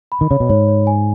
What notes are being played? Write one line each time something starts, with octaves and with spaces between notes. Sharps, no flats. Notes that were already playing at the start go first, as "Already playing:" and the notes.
B5
D#3
C#3 C#5
B2
G#2 C#5
C#5
G#5